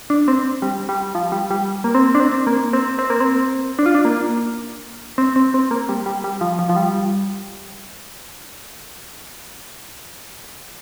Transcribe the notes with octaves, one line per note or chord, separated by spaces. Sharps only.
D4
C4
G3
G3
F3
G3
G3
A#3
C4
D4
C4
A#3
C4
C4
A#3
C4
D4
F4
D4
A#3
C4
C4
C4
A#3
G3
G3
G3
F3
F3
F3
G3